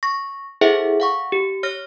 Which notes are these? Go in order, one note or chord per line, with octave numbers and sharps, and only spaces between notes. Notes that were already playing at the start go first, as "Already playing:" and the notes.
C#6 A#6
E4 G#4 A4 C5 E5 F#5
F5 F#5 C#6
G4
C#5 F6 A#6